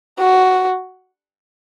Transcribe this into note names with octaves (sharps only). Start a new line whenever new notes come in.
F#4